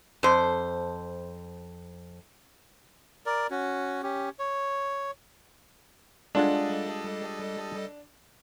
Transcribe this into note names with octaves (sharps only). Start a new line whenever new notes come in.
F2 C5
A#4 D5
C#4 F#4
C#4 G4
C#5
G3 G#3 D4 F4 A4 D#5 F#5